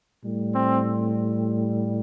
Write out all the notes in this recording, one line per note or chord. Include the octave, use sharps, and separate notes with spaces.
A2 G3
C4